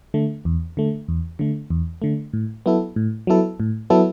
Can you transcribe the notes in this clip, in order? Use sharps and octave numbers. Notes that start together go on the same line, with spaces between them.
D3 A3
E2
D3 A3
E2
D3 A3
E2
D3 A3
A2
F#3 B3 E4 A4
A2
F#3 B3 E4 A4
A2
F#3 B3 E4 A4